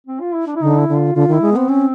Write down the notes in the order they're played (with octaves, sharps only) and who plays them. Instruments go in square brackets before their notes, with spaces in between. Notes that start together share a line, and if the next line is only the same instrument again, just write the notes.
[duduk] C4
F4
E4
D4
E4
[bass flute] D3 [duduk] D#4
[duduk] E4
[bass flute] D3
[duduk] F4
[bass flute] D3 [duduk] F4
[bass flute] D#3 [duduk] E4
[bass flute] G#3
[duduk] B3 [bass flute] C4
[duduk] C4 [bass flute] C#4